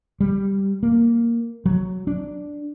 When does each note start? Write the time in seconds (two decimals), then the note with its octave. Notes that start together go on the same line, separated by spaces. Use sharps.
0.20 G3
0.83 A#3
1.66 F#3
2.07 D4